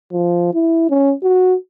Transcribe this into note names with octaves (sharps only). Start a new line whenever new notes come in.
F3
E4
C#4
F#4